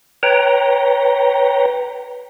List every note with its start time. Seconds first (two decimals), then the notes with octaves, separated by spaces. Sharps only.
0.23 B4 C#5 G5 A#5